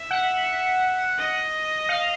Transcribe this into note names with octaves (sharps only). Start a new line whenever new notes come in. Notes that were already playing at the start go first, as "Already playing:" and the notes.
Already playing: E5
F#5
D#5
F5